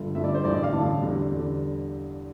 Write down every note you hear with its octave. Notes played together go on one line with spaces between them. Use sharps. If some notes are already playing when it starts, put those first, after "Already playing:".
Already playing: G1 G2 D3 F3
G1 G2 D3 F3 E5
D5
C5
A1 G2 D3 D5
D5
F5
A1 G2 D3 A5
E2 D3 G3
E2 D3 G3